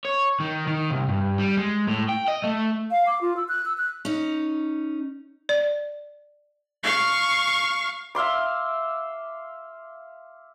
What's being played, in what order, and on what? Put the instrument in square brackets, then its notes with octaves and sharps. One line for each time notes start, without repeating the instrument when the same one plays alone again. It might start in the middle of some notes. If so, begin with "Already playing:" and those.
[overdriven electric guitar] C#5
D#3
D#3
C2
G2
G3
G#3
A2
G5
D#5
A3
[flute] F5
D6
F4
E6
F#6
E6
F#6
[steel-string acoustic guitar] C#4 D#4
[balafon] D5
[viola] F5 C#6
[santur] E5 F5 C6 D6